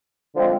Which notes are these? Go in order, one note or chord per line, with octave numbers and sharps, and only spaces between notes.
D3 F3 G#3 C4